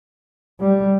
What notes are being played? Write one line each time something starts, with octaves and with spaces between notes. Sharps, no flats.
G3